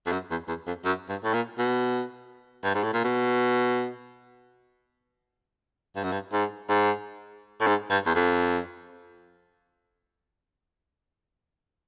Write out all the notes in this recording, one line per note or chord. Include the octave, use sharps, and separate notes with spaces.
F2
F#2
E2
E2
F2
F#2
G2
A2
A#2
B2
G2
G#2
A2
A#2
B2
G2
F#2
G2
G#2
G#2
A2
G#2
G2
E2
F2